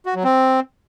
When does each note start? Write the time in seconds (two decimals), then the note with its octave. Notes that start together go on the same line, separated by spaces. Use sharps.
0.06 F#4
0.15 F#3
0.24 C4